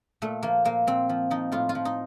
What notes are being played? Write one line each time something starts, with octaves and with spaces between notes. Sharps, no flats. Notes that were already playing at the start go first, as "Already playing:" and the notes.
A#2 A3
F3 A#3
A#2 A#3
A#2 C4
F3
F3 D#4
A2 F4
F4
F3
D#4